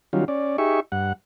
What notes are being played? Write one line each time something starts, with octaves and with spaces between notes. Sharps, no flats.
D#3 F#3 G3 C#4 F4
C#4 D5
D#4 G4 G#4 E5 C#6
G2 F#5